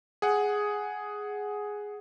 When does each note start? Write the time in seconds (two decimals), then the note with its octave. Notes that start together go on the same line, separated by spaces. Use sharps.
0.22 G#4 F#5